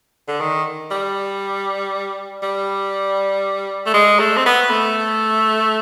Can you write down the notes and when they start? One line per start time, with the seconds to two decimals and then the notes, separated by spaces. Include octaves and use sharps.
0.28 D3
0.40 D#3
0.91 G3
2.43 G3
3.86 A3
3.94 G#3
4.20 A3
4.37 C4
4.46 B3
4.70 A3